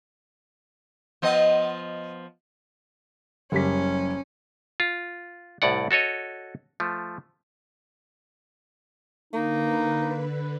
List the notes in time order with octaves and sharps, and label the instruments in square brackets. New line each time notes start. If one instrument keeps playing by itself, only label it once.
[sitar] F3 B3 D#5
[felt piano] F#1 G3 B6 [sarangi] C#4
[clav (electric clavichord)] F4
C2 A2 D5 F#5
F#4 A4 C#5 D#5
F3 A3
[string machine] D3 B4 [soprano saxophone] A#3 [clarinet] D#4